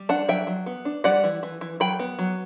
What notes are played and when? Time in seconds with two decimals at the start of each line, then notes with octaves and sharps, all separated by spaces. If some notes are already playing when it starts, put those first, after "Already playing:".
Already playing: G3
0.09 D4 F#5 A5
0.28 F#3 E5 G5
0.47 F#3
0.66 B3
0.85 D4
1.04 G3 D5 F#5
1.24 E3
1.43 E3
1.61 E3
1.80 F#3 G5 B5
1.99 B3
2.19 F#3